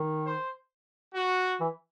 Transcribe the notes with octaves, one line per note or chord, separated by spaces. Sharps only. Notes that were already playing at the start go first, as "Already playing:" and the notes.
Already playing: D#3
C5
F#4
E3